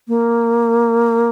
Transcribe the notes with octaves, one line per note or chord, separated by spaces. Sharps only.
A#3